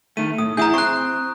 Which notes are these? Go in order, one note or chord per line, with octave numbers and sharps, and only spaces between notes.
D#3 A3 D#7
A2 D#6
E3 E4 G#4 A#5 D#6 G6
C4 C#6 F#6